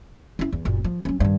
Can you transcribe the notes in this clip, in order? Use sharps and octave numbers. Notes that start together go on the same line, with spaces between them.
C#4 E4
E2
F#1 A#2
F3
F#3 C#4
G2 D#3